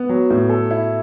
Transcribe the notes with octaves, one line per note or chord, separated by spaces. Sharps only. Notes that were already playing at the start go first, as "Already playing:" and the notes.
Already playing: B3
F#3
A2
A4
E4